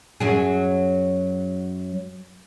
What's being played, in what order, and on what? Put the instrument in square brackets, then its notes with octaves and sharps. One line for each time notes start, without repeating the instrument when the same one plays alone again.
[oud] F#2 F#3 G#4